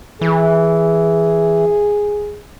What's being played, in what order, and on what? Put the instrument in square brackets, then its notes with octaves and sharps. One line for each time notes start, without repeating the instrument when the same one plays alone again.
[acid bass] E3 [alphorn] G#4